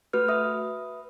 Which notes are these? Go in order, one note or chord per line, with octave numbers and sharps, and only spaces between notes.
A3 F#4 B4 F6
B4 E5 D#6